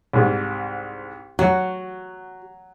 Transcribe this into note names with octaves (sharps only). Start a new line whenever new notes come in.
C2 G#2
F#3 F#4